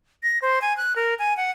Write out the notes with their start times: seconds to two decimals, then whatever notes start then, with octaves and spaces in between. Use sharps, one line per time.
0.23 A#6
0.42 C5
0.62 G#5
0.77 F#6
0.96 A#4
1.19 G#5
1.37 F#5